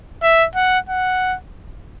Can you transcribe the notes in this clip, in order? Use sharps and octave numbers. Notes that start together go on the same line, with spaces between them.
E5
F#5
F#5